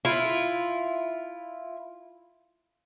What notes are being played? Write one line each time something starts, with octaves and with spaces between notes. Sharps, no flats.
E4 F4